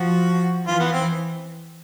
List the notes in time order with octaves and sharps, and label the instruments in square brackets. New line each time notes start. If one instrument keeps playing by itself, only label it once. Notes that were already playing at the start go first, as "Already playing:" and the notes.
Already playing: [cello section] F3 [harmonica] F#4
[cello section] E3 [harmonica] F4
[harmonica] B3
C4